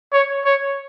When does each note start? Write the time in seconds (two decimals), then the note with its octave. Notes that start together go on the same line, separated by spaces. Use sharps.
0.13 C#5
0.45 C#5